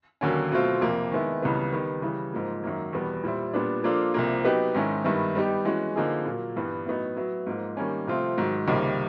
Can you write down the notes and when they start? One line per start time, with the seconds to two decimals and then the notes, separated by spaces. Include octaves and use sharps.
0.21 D#2 D3 F#3 A#3 C#4
0.52 B2 F#3 A3 C4 F4
0.82 F2 C3 F3 A#3
1.12 D#3 G#3 B3 E4
1.42 C#2 C#3 E3 G3 B3
1.73 D#3 G3 B3
2.02 C#3 E3 G3
2.33 G#2 F3 A#3
2.63 F#2 D#3 F#3 A#3
2.93 E2 B2 G3 B3
3.24 A#2 G3 C4 E4
3.53 A#2 G3 B3 D4
3.84 F3 A#3 D4 F4 A4
4.14 C2 C3 F3 A#3
4.45 F#3 B3 D#4 G4 B4
4.74 G#2 D#3 G#3 C#4 E4
5.04 G2 D#3 G3 B3 E4
5.35 G3 B3 D#4 G4
5.65 E3 G#3 C#4 F#4
5.96 D3 F3 A#3 D#4 G#4
6.26 A#2 F#3 A#3
6.56 G2 E3 G3 B3
6.86 A2 F#3 B3 D#4
7.16 F#3 B3 E4
7.47 G#2 F3 A#3
7.77 D#3 G3 A#3 C#4
8.07 C3 F3 A3 C4 F4
8.38 G#2 D#3 F#3
8.67 C#2 C3 D#3 G3 A#3